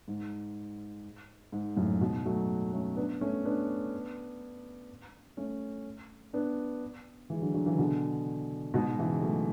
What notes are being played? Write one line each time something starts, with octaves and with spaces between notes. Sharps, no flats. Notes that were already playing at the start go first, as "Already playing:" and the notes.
G#2
G#2
F#2 A2
G#2 B2
F#3 A3
A3 C#4
B3 D4
A3 C#4
B3 D4
A3 C#4
B3 D4
E3 G#3
D3 F#3
D3 F#3
C#3 E3
B2 D3
G#2 B2
C#3 E3
F#3 A3